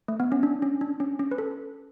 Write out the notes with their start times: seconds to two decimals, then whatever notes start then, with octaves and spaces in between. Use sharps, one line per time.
0.08 A3
0.20 B3
0.32 C#4
0.43 D4
0.62 C#4
0.81 D4
1.00 C#4
1.19 C#4
1.31 B4
1.38 A4